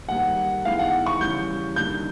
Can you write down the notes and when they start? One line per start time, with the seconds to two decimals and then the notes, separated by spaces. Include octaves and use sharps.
0.09 G#2 D#3 G3 A#3 F#5
0.65 D#3 G#3 B3 E4 F5
0.79 F#5
1.06 C#6
1.20 C#3 E3 G3 G6
1.76 D3 G3 A#3 D#4 G6